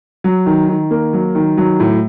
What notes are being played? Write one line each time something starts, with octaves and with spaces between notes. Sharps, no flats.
F#3
D#3
D#3
A#3
F#3
D#3
F#3
A2